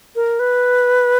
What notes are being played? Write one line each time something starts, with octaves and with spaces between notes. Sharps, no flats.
A#4
B4